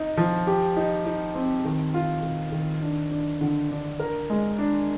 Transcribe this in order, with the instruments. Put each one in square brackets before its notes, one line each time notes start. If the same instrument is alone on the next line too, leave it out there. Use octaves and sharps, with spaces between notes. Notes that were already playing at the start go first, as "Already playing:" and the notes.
Already playing: [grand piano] D#4
F3
G4
D#4
D#4
C4
D#3
F4
D#3
D#3
D4
D4
D3
D4
A#4
G#3
D4